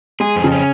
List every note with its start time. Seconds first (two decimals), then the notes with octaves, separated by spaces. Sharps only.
0.20 G#3 G#4
0.36 F2
0.44 C#3
0.52 C#4